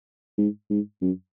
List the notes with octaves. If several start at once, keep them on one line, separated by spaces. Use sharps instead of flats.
G#2
G#2
F#2